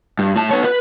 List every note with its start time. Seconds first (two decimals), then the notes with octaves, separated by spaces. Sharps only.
0.19 G2
0.36 A2 A5
0.51 B3 C#5
0.65 B4